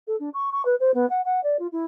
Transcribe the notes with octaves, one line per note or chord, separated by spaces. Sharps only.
A4
D4
C#6
C#6
B4
C5
B3
F#5
F#5
D5
F4
E4